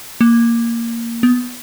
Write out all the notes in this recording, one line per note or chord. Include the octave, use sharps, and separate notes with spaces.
A#3
B3